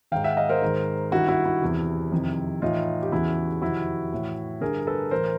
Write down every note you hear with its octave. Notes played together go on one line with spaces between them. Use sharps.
G#2 D#3 F5 G5
E5 F#5
D#5 F5
A#4 C5
G#2 D#3
G2 D#3 E4 F#4
E4 F#4
E4
E2 C3 E3
F2 C3 D#3
A2 E3 D#4 F4
G4
E2 C#3 E3 E4 F#4
F2 C3 D#3 E4 F#4
A2 E3
G2 D3 G#4 A#4
A4 B4
A2 E3 A#4 C5